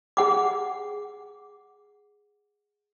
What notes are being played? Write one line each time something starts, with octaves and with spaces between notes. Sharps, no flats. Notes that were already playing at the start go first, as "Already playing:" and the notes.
G#4 F#5 D6